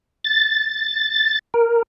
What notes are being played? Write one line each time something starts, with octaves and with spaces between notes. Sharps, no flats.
A6
A#4